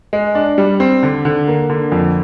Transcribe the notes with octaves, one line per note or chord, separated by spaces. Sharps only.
G#3
D4
G3
C4
D3
D3
A#3
D3
F2